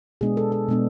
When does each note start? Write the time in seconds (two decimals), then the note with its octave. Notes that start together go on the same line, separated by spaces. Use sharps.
0.21 B2 G#3 B3 D4 G#4
0.37 A4
0.52 A4
0.69 B2 G#3 B3 D4